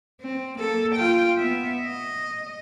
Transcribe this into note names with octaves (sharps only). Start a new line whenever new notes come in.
C4
A#3 A4
F4 G5
B3 E5
D#5